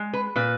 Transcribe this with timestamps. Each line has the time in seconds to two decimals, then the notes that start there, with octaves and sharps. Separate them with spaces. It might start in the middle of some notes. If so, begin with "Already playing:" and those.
Already playing: G#3
0.13 B4
0.36 A#2 B4